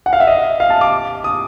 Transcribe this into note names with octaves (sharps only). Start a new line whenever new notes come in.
F#5
F5
E5
D#5
F5
A5
D6
D#6